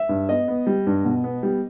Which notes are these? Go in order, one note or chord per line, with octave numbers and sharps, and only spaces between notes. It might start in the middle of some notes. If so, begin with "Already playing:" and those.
Already playing: E5
G2
B3 D#5
B3
G3
G2
B2
B3
G3